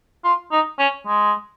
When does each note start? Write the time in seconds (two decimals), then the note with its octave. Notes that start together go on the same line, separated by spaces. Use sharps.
0.24 F4
0.52 D#4
0.79 C#4
1.07 G#3